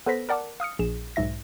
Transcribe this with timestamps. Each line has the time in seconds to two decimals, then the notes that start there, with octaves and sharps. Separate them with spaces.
0.06 B3 A4 B4 C5 A#6 B6
0.29 A#4 D5 F#5 A5 D6
0.60 F5 D#6 F6 C#7
0.79 A#1 G#4 E7
1.16 B1 G#2 E5 A#6